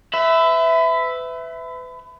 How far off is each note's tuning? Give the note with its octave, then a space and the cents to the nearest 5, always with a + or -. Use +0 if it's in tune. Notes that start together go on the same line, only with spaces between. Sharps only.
B4 +30 E5 +0